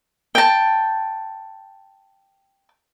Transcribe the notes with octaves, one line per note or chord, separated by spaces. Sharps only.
G5 A5